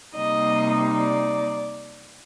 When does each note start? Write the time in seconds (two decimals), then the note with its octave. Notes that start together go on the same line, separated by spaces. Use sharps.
0.15 C3 G3 A#3 D#4 D#5
0.97 D5